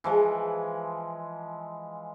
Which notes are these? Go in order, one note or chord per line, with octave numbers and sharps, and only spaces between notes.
E3 F3 G#3